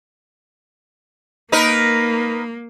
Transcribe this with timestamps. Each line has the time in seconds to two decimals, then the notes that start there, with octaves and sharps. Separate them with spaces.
1.52 A#3 D#4 A#4 B4